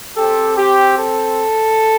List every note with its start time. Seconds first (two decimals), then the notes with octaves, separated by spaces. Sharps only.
0.16 C4 G4 A4
0.56 G4
0.96 A4